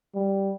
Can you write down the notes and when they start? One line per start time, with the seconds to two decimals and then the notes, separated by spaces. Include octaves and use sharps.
0.15 G3